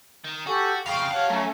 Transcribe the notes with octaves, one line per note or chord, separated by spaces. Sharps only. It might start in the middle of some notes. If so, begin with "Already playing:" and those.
D#3
F#4 G4 A4 G#5
F2 C#3 F5 G5 C6
G4 C#5 F#5 A5
F#3 A3 C#4